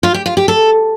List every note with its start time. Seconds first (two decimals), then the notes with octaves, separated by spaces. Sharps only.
0.03 F4
0.14 G4
0.26 F4
0.37 G4
0.48 A4